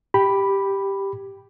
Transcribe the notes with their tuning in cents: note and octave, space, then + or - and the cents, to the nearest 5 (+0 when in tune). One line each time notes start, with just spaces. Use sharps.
G4 +0 B5 +0